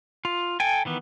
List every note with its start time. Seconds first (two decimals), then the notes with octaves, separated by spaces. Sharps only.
0.25 F4
0.60 A4 G5 G#5
0.85 D#3 E3 B3